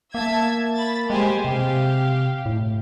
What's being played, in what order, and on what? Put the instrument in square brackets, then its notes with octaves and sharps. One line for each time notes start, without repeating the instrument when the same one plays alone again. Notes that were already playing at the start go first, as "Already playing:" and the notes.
[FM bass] A#3 [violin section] E5 A5 G#6
[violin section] B5 A6
[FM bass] G#3 [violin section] G4 C5 G#5
[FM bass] C3 [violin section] G4 F5
[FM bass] A2